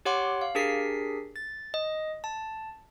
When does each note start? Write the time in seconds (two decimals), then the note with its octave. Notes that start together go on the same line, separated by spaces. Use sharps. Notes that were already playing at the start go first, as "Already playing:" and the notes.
0.05 G4 C#5 F#5 C6 D6
0.41 F5
0.55 D4 G4 G#4 A#4 B6 C7
1.36 A6
1.74 D#5
2.24 A5